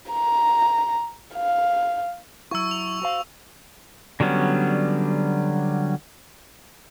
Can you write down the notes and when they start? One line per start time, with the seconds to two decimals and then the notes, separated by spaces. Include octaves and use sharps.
0.11 A#5
1.35 F5
2.51 F#3 E4 C#6 E6
2.71 F7
3.02 F#4 C5 F5
4.20 D3 F#3 G3 B3 C#4